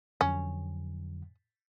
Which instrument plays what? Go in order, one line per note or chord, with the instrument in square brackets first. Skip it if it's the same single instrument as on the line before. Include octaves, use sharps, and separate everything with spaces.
[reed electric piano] F2 D3 F#3 [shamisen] C#4